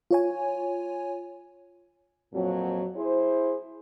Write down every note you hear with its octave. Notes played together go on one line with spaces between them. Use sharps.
F4 C#5 G#5
F2 A#2 F#3
E4 G#4 C5